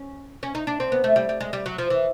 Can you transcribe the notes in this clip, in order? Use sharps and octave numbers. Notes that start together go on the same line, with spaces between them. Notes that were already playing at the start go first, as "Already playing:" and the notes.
Already playing: C#4
C#4
D#4
D4
C4
B3
A3
G3
G3
G#3
G3
F#3
F3
E3